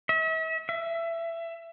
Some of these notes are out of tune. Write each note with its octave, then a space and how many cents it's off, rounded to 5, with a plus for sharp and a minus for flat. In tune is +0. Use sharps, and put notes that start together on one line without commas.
E5 -40
E5 +20